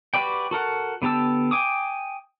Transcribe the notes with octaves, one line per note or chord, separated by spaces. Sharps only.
F#4 G4 B4 D5 G5
F#4 A4 A#4 F#5
D3 B3 G4 A5 E6
G5 G#5 D6 D#6